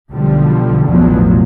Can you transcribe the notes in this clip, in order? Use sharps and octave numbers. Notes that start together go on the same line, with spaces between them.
B1 D3 F3 G3
A1 E2 B2 F3 F#3